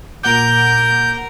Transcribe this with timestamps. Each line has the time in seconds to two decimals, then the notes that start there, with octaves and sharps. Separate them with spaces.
0.23 A#2 A#4 F#5 D6 G6